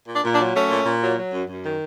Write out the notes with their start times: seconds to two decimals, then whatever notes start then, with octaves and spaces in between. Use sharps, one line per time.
0.08 A#2
0.14 D4
0.24 A#2
0.34 D4
0.40 F#3
0.55 A3 C#4
0.70 A#2
0.85 A#2
1.02 F#3
1.17 F#3
1.33 F#2
1.48 F#2
1.64 D#3